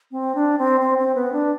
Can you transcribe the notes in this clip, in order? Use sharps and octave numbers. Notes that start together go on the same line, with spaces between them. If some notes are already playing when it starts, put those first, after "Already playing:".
C4
D4
C4
C4
C4
B3
D4